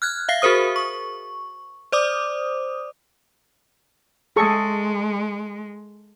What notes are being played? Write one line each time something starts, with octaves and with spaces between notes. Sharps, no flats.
F6 F#6 G#6
E5 F5 C7
F#4 G#4 A#4 C5 D#6
C#6
C5 D5 D6 D#6
G#3 G#4 A4 C#6